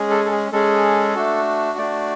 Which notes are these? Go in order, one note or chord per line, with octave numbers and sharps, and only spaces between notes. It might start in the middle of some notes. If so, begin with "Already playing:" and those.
Already playing: G#3 C#4 G#4
A4
A4
G#4
G#3 C#4 G#4 A4
A3 D4 F#4
A3 D4 F#4 D5